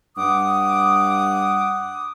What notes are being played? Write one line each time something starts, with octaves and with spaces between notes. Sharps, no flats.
G2 F#5 D6 D#6